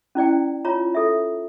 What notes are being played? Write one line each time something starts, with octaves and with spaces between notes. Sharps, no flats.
C#4 E4 D5 G5
F4 C#5 A#5
A4 E5